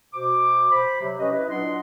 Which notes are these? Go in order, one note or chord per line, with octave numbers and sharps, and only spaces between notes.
B2 F#4 C5 D6
C5 B5
C3 F#3
C#4 G4 B4 D#5
E4 B4
A#2 F#3 D4 D#5 F#5 C6